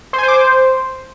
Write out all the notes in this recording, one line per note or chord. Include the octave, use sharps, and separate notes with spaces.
C5
G#5
C5
D6
C5